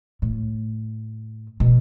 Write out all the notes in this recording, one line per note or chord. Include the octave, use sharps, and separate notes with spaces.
A2
B2